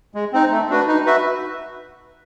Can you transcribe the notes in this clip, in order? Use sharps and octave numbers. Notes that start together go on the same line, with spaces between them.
G#3
C4 D#4
A3
D4 F#4 B4
D#4
F#4 B4 E5